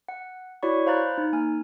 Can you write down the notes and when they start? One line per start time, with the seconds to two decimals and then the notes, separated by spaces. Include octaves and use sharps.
0.09 F#5
0.63 E4 F#4 C#5 D5 B5 C#6
0.86 C5 F5 A#5 B5 F#6 A6
1.18 D#4
1.33 A#3 G#5 F6